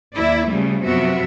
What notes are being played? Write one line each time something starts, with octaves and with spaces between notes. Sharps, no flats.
D#2 E4 D5 E5
C#3 F3 G3 A3
F#2 C3 F3 B3 F#4 E5